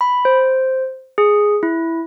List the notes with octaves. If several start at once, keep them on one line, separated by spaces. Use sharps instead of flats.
B5
C5
G#4
E4